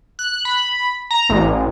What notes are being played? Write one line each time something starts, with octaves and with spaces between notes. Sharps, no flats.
F#6
B5
A#5
A1